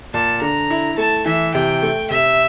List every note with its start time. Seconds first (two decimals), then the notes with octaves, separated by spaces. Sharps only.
0.13 A#2 A5
0.41 D3 A#5
0.70 E4
0.98 A3 A5
1.26 E3 E5
1.54 C3 G5
1.82 A3
2.10 C3 E5